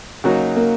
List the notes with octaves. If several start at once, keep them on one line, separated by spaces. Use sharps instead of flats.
C#3 F#3 A#3 D#4 F#4
A#3